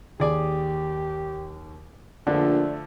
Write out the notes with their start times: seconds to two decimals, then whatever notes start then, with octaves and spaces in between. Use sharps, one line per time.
0.20 D#2 G4 G#4 D5 G#5
2.27 A#1 D3 F3 A3 D4